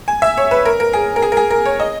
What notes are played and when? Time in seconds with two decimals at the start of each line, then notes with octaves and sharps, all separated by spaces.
0.08 G#5
0.22 E5
0.37 C#5
0.51 B4
0.65 A#4
0.80 A#4
0.93 G#4
1.16 A#4
1.22 G#4
1.32 A#4
1.37 G#4
1.51 A#4
1.66 C#5
1.80 D#5